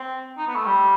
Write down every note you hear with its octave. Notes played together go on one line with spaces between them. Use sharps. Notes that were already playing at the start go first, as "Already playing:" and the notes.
Already playing: C4
D#4
B3
A3
G3